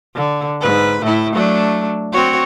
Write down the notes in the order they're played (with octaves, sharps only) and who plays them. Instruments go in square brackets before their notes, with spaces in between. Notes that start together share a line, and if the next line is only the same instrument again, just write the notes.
[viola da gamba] D3
G#2 B4
A2 E4
F#3 A3 D4
C4 F#4 C#5